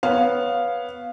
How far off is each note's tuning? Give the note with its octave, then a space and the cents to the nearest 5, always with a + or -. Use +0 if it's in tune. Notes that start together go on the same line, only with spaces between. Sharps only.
B3 -5 C#5 +0 F5 +0